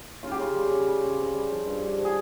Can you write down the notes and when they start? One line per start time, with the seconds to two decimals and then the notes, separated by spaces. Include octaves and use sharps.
0.23 C#3 F4
0.31 G4
0.39 C#3 F4
0.55 G3
0.71 C#3
0.87 G3
1.03 C#3
1.19 C4
1.35 G3
1.51 F3
1.66 G2
1.83 G2
1.99 F3
2.05 G#4